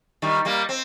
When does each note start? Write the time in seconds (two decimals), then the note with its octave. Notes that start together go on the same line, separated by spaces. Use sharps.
0.22 D#3 G3
0.45 G3 A#3
0.69 C4